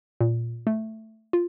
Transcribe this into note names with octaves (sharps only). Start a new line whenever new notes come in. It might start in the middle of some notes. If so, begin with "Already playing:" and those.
A#2
A3
F4